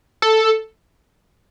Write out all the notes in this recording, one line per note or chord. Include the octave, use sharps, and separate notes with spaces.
A4